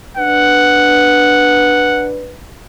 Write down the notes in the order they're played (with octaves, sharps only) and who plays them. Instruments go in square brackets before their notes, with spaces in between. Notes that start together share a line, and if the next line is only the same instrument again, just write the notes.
[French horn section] D4 B4 [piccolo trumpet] F#5